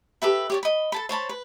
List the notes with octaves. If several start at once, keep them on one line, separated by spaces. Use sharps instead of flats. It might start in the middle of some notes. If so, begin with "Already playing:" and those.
G4 A4 B4 E5
G4 C#5 D5
D#5 B5
A4 A5 B5
C5 C#5 A5 B5
B4